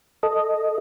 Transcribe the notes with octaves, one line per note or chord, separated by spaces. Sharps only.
A4 D#5